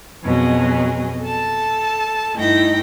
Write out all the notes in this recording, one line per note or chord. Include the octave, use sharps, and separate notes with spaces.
F2 B2 F#3 G#4 D#5
A4 A5
G2 A3 D#4 E4 G5 A#6